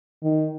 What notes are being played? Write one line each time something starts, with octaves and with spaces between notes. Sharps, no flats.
D#3